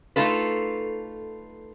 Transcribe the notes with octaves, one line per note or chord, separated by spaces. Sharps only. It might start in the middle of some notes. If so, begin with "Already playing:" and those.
A3 D#4 F4 A4 B4